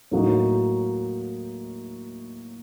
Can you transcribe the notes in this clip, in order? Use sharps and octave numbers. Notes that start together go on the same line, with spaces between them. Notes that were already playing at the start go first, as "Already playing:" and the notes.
A2 F#3 A#3 D#4 F#4